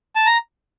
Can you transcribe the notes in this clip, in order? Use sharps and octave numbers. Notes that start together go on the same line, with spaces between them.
A5
A#5